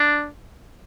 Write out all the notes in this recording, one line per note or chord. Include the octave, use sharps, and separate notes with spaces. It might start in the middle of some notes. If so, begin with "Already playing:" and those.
Already playing: D4